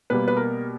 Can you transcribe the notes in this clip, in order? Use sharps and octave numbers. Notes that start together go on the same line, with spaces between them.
B2 G3 A#3 B4
B4
A#4